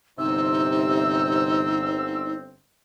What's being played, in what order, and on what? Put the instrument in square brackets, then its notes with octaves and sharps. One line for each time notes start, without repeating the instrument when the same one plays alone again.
[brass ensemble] G1 C4 [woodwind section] C3 [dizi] D#4 [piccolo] E6